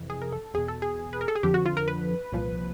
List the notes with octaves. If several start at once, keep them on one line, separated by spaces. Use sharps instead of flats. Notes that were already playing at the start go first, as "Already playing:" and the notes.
Already playing: F2 C3 E3
G#4
A#4
A4
E2 B2 G#4
A4
G#4
B4
A#4
A4
G#4
F2 D3 F3 G4
F#4
F4
A#4
B4
C2 A#2 F3